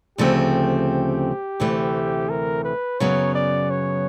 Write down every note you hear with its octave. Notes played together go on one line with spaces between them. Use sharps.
D2 C#3 F3 A3 C4 G4
D2 C3 E3 A3
A#4
B4
F#2 C#3 F#3 B3 C#5
D5
C#5